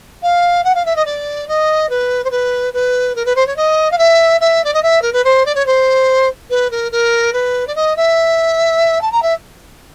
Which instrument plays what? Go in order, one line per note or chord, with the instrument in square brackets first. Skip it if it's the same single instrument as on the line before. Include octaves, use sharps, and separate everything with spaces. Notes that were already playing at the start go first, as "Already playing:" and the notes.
[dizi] F5
F#5
F5
E5
D#5
D5
D#5
B4
C5
B4
B4
A#4
B4
C5
C#5
D#5
F5
E5
E5
D5
D#5
E5
A#4
B4
C5
D5
C#5
C5
B4
A#4
A#4
B4
D5
D#5
E5
A5
A#5
E5